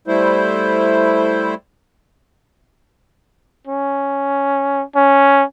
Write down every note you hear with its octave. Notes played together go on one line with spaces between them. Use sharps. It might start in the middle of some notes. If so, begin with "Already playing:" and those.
G3 A3 E4 C5
C#4
C#4